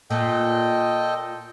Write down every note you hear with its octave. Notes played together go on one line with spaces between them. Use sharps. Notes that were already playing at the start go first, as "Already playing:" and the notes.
A#2 A4 D#5 G5